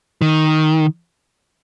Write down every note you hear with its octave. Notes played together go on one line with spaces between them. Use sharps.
D#3